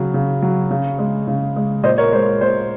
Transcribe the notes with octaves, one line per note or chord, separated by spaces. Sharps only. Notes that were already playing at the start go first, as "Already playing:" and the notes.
Already playing: C#3 F#3
C#3
F#3
C#3
G#3
C#3
G#3
A#2 C5 D#5
A#4 C#5
G#3 C5
A#2 C5